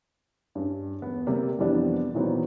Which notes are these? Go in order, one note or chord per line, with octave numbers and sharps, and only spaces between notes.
G2 C#4
E1 B3
C3 G3 A#3
F2 E3 F3 G3 B3 D4
A#2 D#3 E3 F#3 B3 C4